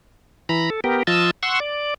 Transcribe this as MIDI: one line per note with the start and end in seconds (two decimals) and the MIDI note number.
0.49 0.70 52
0.49 0.70 82
0.49 0.70 83
0.70 0.80 69
0.84 1.03 59
0.84 1.03 67
0.84 1.03 70
1.07 1.31 53
1.07 1.31 65
1.07 1.31 75
1.07 1.31 81
1.07 1.31 88
1.43 1.60 78
1.43 1.60 84
1.43 1.60 85
1.43 1.60 88
1.60 1.94 74